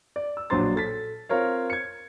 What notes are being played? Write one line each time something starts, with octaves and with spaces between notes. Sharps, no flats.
D5
E6
A#1 F#3 D4 C5 C6 A6
A4 A6 B6
C4 F4 A#4 C#5 F5
G#6 C#7